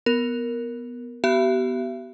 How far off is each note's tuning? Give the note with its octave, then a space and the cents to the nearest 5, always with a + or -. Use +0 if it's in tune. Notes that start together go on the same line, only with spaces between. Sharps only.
B3 +0 A#4 +0
B3 +0 G4 -40 E5 +35